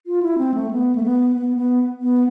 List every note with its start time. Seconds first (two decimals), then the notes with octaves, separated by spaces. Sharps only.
0.07 F4
0.23 E4
0.38 C4
0.54 A3
0.71 B3
0.95 A3
1.04 B3
1.36 B3
1.57 B3
2.01 B3